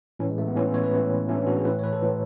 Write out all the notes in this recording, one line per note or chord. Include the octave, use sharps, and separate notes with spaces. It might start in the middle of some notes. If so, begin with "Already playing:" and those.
A2 E3 C#4
G#3
A3
B3
A2 E3 C#4
E4
C#5
B4
A2 E3
A2 E3 C#4
D4
F#4
G#4
A2 E3 B4
C#5
B4
A4
A2 E3